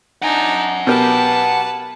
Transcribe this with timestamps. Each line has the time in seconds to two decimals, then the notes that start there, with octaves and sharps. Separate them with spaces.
0.22 D4 D#4 F#5 G#5
0.87 B2 G4 A#4 B4 A5